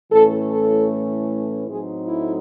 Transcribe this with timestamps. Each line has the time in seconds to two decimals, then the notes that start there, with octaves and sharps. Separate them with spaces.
0.11 A2 E3 A3 C#4 A4
0.50 A4
1.68 A2 F#3 A3 C4 D#4 G#4
2.08 E4